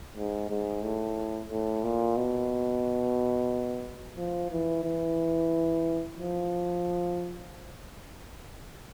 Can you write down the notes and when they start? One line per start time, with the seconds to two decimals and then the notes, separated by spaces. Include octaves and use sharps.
0.16 G#2
0.50 G#2
0.83 A2
1.51 A2
1.84 A#2
2.17 B2
4.17 F3
4.51 E3
4.84 E3
6.18 F3